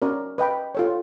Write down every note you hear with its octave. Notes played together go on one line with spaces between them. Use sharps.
C#4 F#4 A#4 D5
B4 D#5 G5 B5
F4 A4 C#5